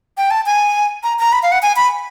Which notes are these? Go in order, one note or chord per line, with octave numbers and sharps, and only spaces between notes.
G5
A5
G#5
A#5
A#5
B5
F5
F#5
G#5
B5